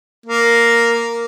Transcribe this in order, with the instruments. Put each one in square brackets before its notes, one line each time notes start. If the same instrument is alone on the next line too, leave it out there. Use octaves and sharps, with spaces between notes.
[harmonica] A#3